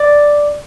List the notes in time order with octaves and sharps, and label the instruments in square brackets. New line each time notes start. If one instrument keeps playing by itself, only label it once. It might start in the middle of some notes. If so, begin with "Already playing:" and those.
Already playing: [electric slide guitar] D5